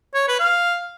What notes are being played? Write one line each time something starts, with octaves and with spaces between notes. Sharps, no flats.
C#5
B4
F5